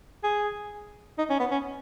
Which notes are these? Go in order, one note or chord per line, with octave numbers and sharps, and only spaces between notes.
G#4
D#4
C#4
B3
C#4